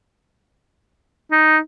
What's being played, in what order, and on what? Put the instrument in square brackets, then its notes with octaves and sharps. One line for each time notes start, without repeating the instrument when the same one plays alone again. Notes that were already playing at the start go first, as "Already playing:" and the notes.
[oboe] D#4